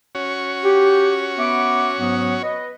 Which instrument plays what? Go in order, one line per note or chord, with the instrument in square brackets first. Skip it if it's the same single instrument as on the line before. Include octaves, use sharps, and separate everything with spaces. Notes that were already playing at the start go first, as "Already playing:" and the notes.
[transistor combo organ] C#4 F#4 C#5
[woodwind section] G4
B3 E5 D6
G#2 F#3 B3
B4 D#5